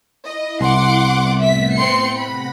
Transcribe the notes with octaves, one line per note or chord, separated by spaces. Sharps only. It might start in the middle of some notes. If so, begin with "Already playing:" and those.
E4 D#5
C2 F#5 C6 D6
G3 B3
A2 A3 B3 E5 B6
C4 C6 C#7
C3 F#5 B5 A#6